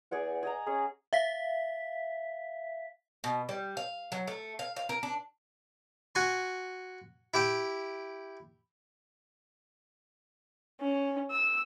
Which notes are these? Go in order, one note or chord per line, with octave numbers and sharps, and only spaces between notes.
E2 G#4 D5 F#5
G#4 D#5 A#5
C#4 G#4
E5 F5 B6
B2
G3
F5
F#3
A3
F5
F5
A#4
D4
F#4 G#5 C6
E4 G4 E5 G5
C#4
E6